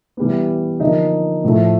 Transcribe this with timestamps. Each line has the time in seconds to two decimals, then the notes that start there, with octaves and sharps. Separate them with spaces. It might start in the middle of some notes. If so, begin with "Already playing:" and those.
0.17 E3 G3 B3
0.80 D3 F3 A#3 D#4
1.44 A2 F3 A3